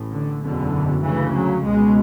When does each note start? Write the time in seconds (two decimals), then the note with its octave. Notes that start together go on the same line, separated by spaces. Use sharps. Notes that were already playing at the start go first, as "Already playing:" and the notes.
Already playing: A1 A2
0.14 D3
0.43 F#1 E2 B2 D3
1.04 D2 C#3 E3
1.34 F#3
1.64 C#2 B2 G#3